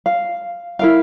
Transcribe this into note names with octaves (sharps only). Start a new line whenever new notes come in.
F5
E4 A#4 F5